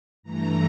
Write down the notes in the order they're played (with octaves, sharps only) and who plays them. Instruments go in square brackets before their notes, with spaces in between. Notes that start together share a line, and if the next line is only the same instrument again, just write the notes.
[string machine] G2 E3 A3 A#5